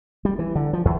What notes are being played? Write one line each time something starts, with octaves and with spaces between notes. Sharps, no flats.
G3
E3
D3
F3
E2